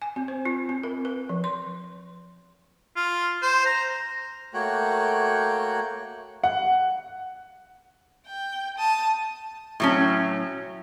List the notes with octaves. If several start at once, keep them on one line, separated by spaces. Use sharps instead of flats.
G#5
C4
C5
F4
C4
A#4
B4
F3
C6
F4
C5
A#5
A3 A#3 F#4 C#5 G5 F#6
F#5
G5
A5 D#6
A2 F#3 C#4